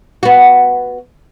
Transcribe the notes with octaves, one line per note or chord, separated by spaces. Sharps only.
B3 F#4